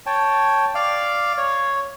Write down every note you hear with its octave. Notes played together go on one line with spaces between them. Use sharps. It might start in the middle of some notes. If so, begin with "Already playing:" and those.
C#5 G5 A5
D5 F5
C#5